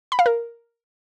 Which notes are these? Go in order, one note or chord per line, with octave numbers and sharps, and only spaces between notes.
B5
F5
A#4